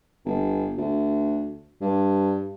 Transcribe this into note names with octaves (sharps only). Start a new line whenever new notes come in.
G1
D2
G2